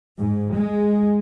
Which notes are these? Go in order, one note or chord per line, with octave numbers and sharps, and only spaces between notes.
G#2
G#3